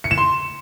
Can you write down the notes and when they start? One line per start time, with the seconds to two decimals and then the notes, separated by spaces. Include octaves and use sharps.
0.04 C#7
0.11 E7
0.18 C6